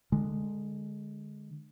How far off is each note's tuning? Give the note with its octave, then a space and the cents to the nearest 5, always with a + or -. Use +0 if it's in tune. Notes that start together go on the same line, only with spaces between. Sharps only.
D3 +20 G#3 +0